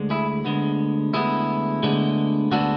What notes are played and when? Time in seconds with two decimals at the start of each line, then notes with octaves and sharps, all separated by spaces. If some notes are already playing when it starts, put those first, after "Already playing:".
Already playing: D2 D3 G#3
0.10 E4 G#4
0.45 D2 D3 G#3 B3
1.14 D2 D3 G#3 B3 E4 G#4
1.83 D2 D3 G#3 B3 D4
2.51 D2 D3 G#3 B3 D4 F#4 A4